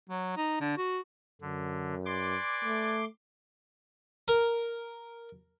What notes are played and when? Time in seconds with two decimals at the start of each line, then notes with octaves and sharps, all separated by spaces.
0.09 F#3
0.37 D#4
0.61 D3
0.77 F#4
1.42 F#2 D3
2.06 B4 D5 G#5 C6 D6
2.64 A3
4.28 A#4